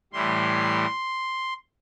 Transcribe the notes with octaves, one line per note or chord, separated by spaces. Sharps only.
A2 E3 G3 C6